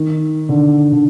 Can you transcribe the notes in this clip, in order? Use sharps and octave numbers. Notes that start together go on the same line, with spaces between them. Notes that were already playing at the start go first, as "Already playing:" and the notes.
Already playing: D#3
D3
D3